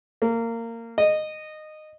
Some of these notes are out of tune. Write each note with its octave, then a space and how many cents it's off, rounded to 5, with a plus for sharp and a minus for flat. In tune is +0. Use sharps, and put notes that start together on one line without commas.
A#3 -20
D#5 -15